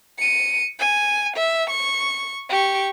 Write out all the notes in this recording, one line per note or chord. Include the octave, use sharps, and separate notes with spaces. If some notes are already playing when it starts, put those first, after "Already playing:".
C#7 D#7
G#5
E5
C#6
G4 C#6